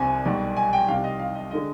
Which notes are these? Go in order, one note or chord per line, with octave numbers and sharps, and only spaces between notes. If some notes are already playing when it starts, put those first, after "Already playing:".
Already playing: C2 C3 G3 C4 G#5
B1 B2 G3
G#5
G5
C2 C3 G3 F5
D#5
F5
D#5
D3 G#3 D#5